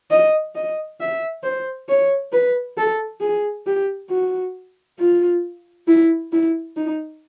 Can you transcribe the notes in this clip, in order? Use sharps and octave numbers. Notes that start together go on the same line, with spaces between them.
D#5
D#5
E5
C5
C#5
B4
A4
G#4
G4
F#4
F4
E4
E4
D#4